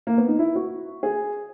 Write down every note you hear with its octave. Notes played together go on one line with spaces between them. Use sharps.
A#3
B3
D#4
E4
F#4
G#4